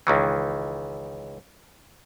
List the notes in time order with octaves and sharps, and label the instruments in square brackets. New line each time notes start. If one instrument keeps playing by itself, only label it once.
[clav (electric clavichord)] C#2 D#3 E3